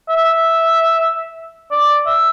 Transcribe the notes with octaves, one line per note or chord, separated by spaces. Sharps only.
E5
D5
E5